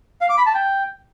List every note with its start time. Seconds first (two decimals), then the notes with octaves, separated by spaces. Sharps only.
0.21 F5
0.29 D6
0.38 B5
0.46 A5
0.54 G5